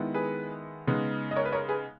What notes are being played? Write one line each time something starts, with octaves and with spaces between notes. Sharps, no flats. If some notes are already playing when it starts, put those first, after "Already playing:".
Already playing: D#3 G#3 B3 E4
G#4 B4
C#3 G#3 B3 D#4
D#5
A#4 C#5
B4
A#4 C#5
G#4 B4